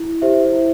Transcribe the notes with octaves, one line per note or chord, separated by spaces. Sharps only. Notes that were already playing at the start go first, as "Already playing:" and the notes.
Already playing: E4
G4 C5 E5
E4